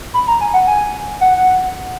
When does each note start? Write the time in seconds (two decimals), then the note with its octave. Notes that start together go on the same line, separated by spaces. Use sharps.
0.14 B5
0.27 A#5
0.41 G#5
0.53 F#5
0.67 G#5
1.21 F#5